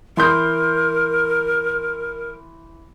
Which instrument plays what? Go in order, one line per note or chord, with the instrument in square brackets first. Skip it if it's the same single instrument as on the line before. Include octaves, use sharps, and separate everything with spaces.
[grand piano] E3 C6 G6 [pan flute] A#4